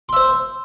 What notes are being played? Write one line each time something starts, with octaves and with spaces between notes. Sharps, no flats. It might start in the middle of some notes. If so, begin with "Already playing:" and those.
C5 E5 C6